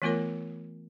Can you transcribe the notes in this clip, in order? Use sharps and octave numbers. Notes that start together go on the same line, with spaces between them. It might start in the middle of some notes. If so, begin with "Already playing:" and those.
E3 A3 B3 F4 A#4 C#5